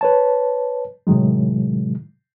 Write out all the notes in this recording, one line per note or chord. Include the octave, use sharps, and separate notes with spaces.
B4 C#5 A5
A2 C3 D#3 F#3 G#3